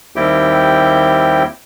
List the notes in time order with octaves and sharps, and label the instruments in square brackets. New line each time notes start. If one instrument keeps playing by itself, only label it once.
[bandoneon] D#2 G3 C4 E4 G4 G5